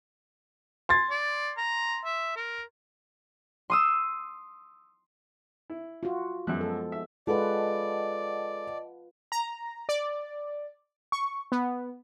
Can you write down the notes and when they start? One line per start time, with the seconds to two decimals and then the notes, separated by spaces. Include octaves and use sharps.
0.89 C6 G#6 A6
1.11 D5
1.58 A#5
2.05 E5
2.36 A#4
3.70 C6 D#6 E6
5.70 E4
6.03 F4 F#4
6.47 F#2 F3 G#3 B3 E5 F#6
6.61 A4
6.92 E5
7.27 G#3 F4 A4 B4 D5 D#5 F#5 A5
9.32 A#5
9.89 D5
11.12 C#6
11.52 B3